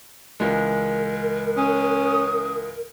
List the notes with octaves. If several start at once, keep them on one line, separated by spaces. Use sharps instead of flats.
C#2 E3 G#3 A#4
C#4 D#6